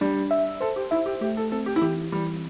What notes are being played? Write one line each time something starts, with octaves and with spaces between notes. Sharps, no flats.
G3 D4
E5
A4 C5
G4
E4 E5
G4
A3 G4
A4
C4 A4
G4
E4
E3 G4
E3 G3